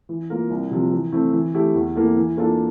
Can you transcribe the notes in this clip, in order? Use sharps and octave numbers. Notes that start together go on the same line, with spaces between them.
E3
A#3 F4 A#4
C2
C3 F3
E3
A3 C4 E4
E3
A3 E4 G4
E2
E3 A#3 E4 A4
E3
A#3 D4 F4 A4